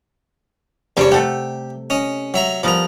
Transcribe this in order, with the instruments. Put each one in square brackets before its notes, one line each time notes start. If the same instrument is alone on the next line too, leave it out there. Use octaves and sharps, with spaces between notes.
[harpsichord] E2 D4 C#5 [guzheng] C3 G3 G4
[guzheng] A3 A4 F#5 [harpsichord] G4
[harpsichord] C#4 D#5
F#3 E5 A#5
[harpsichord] F3 A#5 [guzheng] G3 B3 A#4